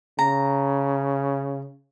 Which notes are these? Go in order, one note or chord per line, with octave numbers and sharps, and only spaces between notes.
C#3 A#5